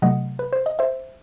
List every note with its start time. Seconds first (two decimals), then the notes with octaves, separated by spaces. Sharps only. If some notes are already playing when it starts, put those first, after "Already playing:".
0.02 C3 F#3 A3 D#5 F#5
0.39 B4
0.53 C5
0.66 D#5
0.79 C5 E5